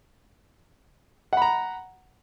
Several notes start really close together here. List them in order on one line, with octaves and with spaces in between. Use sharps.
F#5 B5 A#5